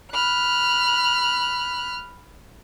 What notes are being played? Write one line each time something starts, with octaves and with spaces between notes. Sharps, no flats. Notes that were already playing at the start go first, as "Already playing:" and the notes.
B5 F6 F#6